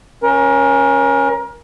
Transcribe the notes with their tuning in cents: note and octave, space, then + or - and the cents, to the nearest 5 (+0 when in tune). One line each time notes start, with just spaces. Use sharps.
C#4 -10 A#4 +30